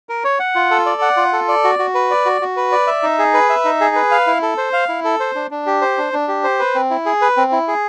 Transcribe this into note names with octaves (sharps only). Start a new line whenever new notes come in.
A#4
C#5
F#5
F4
A4
D5
F#5
F4
A4
D5
F#4
F#4
B4
D5
F#4
F#4
B4
D5
E5
D#4
G#4
B4
E5
D#4
G#4
B4
F5
E4
A4
C5
F5
E4
A4
C5
D4
D4
G4
C5
D4
D4
G4
C5
B4
C4
E4
G#4
B4
C4
E4
G#4